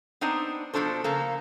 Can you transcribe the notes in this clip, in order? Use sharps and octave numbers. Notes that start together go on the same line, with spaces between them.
B3 C4 D4 D#4 C5
B2 F3 D4 A4 C5
C#3 A#3 A4